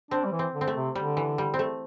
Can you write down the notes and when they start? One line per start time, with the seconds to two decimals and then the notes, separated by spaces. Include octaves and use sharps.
0.11 C4 D4
0.25 G3
0.32 E3
0.39 C4
0.54 D3
0.61 C4
0.67 A3
0.75 C3
0.95 D3 G3
1.17 E3
1.38 G3
1.54 C4
1.59 A3